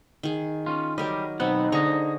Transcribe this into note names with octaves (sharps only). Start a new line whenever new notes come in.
D#3 G#4
C#4 F4
F#3 G3 G4 A#4 D#5
B1 B3 C4 D#4 F#5
D3 G#4 D#5 A#5 C#6